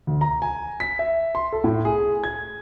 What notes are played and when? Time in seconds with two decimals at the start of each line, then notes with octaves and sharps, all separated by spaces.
0.07 D2
0.21 A#5
0.42 G#5
0.80 B6
0.99 E5
1.35 C6
1.52 A4
1.64 A2
1.85 G#4
2.24 G#6